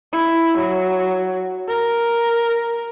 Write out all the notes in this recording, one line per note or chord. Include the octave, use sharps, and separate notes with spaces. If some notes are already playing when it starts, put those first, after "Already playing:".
E4
F#3
A#4